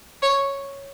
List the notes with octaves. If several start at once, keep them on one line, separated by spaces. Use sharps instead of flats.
C#5